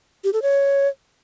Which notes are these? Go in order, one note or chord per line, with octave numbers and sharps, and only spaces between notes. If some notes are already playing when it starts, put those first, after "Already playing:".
G4
A4
C#5